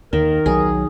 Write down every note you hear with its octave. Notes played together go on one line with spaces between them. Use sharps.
D#2 D#3 A#4
B1 F3 F#3 G#4